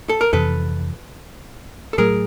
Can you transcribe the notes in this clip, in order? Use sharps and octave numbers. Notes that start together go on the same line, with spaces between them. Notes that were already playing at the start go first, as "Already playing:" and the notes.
A4
A#4
F2 C3 E3 A4 B4
A4
A2 F#3 A3 G#4 A#4